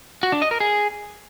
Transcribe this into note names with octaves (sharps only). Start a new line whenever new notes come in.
F#4
D4
D#5
A#4
G#4